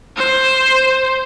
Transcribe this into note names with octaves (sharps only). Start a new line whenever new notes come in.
C5